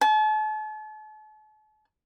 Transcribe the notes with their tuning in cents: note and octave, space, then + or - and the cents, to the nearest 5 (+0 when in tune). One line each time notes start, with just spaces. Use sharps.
A5 -40